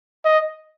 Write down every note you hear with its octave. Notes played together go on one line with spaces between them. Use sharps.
D#5